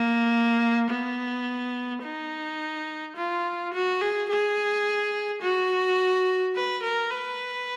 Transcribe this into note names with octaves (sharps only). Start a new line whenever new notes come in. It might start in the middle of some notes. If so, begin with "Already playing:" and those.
Already playing: A#3
B3
D#4
F4
F#4
G#4
G#4
F#4
B4
A#4
B4